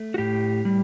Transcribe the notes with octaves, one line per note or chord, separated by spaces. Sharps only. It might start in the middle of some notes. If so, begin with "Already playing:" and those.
Already playing: A3
F#4
A2 G4
G3